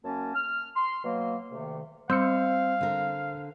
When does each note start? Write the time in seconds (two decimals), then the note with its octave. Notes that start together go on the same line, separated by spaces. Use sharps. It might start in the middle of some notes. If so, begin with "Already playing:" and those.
0.04 F#2 A#3 C#4 A5
0.34 F6
0.76 C6
1.03 B2 F#3 A#3
1.51 D2 C3 D#3 A3
2.10 G3 C4 C5 F5 E6 C#7
2.81 D3 A#4